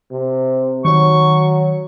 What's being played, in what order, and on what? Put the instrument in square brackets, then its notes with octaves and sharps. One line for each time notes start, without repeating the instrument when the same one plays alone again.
[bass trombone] C3
[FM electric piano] D#3 C#5 [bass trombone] F#3 [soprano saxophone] C#6